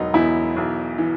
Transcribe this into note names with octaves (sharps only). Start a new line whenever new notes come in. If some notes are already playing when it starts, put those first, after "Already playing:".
Already playing: E1 B2 F#3 D#4
E2 E4
B1
E3